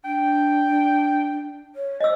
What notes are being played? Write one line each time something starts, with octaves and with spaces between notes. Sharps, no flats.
D4 G5
C#5
C5 D#5 E6